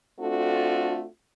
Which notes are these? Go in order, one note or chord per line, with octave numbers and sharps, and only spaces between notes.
A3 C4 D4 F4 F#4 A4